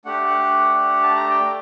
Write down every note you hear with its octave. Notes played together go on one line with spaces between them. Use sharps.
A3 D4 G4 F#5
F#5
F#5
A5
A#5
G5